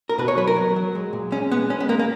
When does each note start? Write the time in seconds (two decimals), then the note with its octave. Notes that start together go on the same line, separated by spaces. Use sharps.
0.09 A#4
0.18 B2 B4
0.28 C#5
0.37 F#3 B4
0.48 A#4
0.56 F#3
0.76 F#3
0.95 G#3
1.13 A#2
1.32 G#3 C#4
1.51 G#3 B3
1.70 G#3 C#4
1.80 B3
1.89 G#3 A#3
1.99 A#3